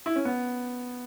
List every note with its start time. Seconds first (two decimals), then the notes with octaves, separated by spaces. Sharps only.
0.06 E4
0.16 C#4
0.25 B3